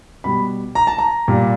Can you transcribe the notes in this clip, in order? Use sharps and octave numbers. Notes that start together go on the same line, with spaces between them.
B2 G3 B5
A#5
A5
A#5
A#2 G3